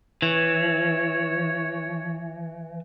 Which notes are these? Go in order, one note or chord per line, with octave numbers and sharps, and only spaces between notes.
E3 C#5